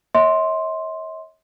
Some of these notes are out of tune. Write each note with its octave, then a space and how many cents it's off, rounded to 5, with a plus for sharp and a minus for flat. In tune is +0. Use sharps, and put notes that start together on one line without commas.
C#5 +0 E5 -45 C6 +5